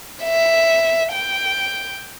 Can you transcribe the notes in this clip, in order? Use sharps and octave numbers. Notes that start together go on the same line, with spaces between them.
E5
G5